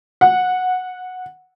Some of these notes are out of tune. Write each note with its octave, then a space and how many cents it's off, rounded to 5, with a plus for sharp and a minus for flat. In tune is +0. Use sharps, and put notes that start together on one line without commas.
F#5 -15